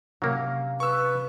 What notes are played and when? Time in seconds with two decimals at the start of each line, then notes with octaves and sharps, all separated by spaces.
0.22 C3 F#3 A#3 C#4 F5
0.80 B4 C#6 E6